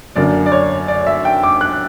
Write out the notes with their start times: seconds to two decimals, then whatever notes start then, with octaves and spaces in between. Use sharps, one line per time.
0.16 F#2 D3 A#3 D5
0.46 D5
0.52 C#5
0.88 D5
1.07 E5
1.25 G5
1.43 D6
1.61 F#6